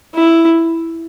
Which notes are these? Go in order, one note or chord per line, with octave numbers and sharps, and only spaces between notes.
E4